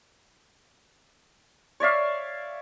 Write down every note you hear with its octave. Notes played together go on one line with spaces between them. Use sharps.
C#5 D5 E5 F5